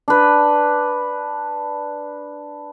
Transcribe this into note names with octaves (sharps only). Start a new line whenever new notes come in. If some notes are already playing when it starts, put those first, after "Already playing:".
D4 B4